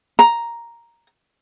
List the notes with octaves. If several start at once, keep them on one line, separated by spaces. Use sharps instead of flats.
A#5